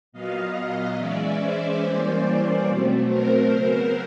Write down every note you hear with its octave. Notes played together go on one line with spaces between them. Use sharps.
A#2 F#3 B3 D#5 F5
E3 G#3 C#4 D5 E5
C5 D5
E3 G3 A#3 C#4 C5 D5
B2 F#3 A3 C4
A#4 C5
C#3 F#3 B3